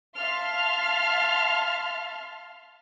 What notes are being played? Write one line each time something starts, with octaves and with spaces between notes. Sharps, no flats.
E5 F5 A5 C6 F6